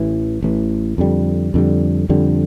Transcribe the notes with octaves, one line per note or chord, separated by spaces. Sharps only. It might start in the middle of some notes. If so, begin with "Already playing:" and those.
Already playing: A1 A2 E3
A1 A2 E3
F2 D3 G3
F2 D3 G3
F2 D3 G3